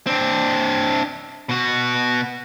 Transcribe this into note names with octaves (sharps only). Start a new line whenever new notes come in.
C4 D4
B2 F#4